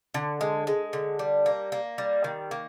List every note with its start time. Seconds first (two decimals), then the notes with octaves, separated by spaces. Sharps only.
0.14 D3
0.41 G#3
0.67 G#3
0.93 D3
1.19 G3
1.46 A#3
1.72 A#3
1.98 G3
2.24 D#3
2.51 A#3